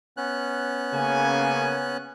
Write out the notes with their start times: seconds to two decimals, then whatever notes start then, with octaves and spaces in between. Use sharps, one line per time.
0.17 B3 C#4 F#6
0.93 C#3 A#3 G#5